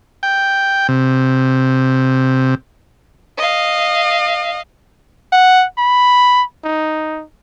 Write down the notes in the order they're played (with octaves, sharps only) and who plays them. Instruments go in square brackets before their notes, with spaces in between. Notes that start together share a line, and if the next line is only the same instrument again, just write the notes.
[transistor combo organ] G5
C3
[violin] D#5 F5
[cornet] F#5
B5
D#4